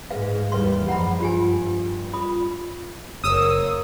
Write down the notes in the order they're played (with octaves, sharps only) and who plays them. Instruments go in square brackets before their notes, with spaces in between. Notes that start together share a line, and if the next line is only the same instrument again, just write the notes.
[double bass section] G#2 G#3 [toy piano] B4 F5
[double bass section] D#2 E3 G3 [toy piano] B4 F5 C6
[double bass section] F#2 F3 G#3 [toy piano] F#5 A#5 B5
[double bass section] G2 [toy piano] F4 G4 G#5
[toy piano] F4 B5 D#6
[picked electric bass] F#1 [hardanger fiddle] A#3 C#5 [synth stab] D#6 E6